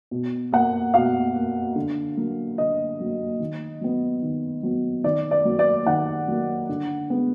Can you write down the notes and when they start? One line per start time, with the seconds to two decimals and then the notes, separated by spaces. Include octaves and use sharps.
0.11 B2
0.52 A#3 F#5
0.94 B2 F5
1.35 A#3
1.76 D3
2.17 F#3 A#3
2.58 D3 D#5
2.99 F#3 A#3
3.40 D#3
3.81 F#3 B3
4.23 D#3
4.63 F#3 B3
5.04 D#3 D5
5.31 D5
5.45 F#3 A#3
5.59 D5
5.86 D#3 F#5
6.28 F#3 A#3
6.69 D3
7.10 G#3 B3